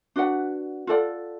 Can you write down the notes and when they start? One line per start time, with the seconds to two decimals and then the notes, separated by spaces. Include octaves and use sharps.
0.16 D4 F#4 B4 F#5
0.87 F4 A4 D5 F#5